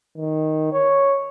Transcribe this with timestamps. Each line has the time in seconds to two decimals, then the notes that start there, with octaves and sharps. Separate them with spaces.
0.17 D#3
0.72 C#5